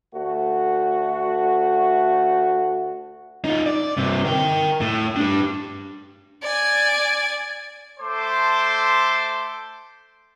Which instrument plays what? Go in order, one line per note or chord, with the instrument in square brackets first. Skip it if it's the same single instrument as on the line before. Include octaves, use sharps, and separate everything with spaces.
[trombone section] D2 A3 F#4
[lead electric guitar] D#4 F4
D5
G2 C3
A#4 G5
A2
D4 G4
[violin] D5 G#5
[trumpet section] A3 A4 C5 C6 D6